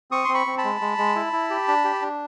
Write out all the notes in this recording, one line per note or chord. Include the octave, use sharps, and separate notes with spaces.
C4 C#6 D#6
C4 C6
B5 C#6
C4
A5 B5
G#3
G#3
G#3
E4
E4
G4
D4
G4
D4